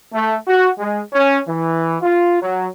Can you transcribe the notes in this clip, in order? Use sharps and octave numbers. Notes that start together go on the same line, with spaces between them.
A3
F#4
G#3
C#4
E3
F4
F#3